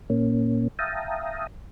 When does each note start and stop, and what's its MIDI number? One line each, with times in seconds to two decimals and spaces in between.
0.10 0.68 46
0.10 0.68 58
0.10 0.68 61
0.79 1.47 76
0.79 1.47 77
0.79 1.47 79
0.79 1.47 81
0.79 1.47 82
0.79 1.47 87